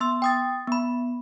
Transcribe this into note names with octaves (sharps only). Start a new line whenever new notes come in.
B3 C6 E6
G5 D#6 A6
B3 B5